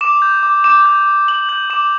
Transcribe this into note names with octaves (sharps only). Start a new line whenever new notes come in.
D6 E7
G6
D6
D6 E7
G6
D6
D6 F#7
G6 F#7
D6 E7